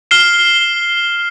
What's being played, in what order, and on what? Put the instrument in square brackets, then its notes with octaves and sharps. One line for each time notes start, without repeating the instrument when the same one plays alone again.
[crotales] F6 C7 E7 G7